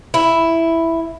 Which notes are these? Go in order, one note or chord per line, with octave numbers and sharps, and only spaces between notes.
E4